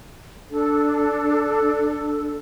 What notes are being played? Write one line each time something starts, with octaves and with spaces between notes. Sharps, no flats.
D4 A4